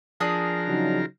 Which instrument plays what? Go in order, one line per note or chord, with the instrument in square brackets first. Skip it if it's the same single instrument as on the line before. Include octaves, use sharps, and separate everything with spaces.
[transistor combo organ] F3 A#4 [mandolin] D4 G#4 D#6
[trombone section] C#3 F#3 D#4